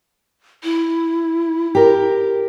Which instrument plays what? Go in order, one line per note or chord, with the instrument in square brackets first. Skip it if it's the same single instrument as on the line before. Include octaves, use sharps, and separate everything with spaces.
[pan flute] E4
[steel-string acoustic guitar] G4 A#4